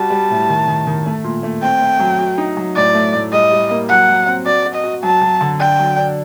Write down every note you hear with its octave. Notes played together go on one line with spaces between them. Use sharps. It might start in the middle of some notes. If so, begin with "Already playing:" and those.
Already playing: G3 F#4 A5
G3
A2
D#3
D#3
D#3
A3
A#2
A3
C4 G5
A3
F#3
F#4
D#4
F#3
A2 D5
A3
A2
G3 D#5
G3
A#3
F#3 F#5
F#3
C4
F#4 D5
F#4
D#5
F#4
F#3 A5
F#3
D3
D4 G5
F#3
D4